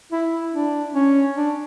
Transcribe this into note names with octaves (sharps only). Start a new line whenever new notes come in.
E4
D4
C#4
D4